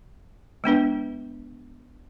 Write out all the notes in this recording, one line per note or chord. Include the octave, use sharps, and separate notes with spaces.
G#3 B3 D4 B4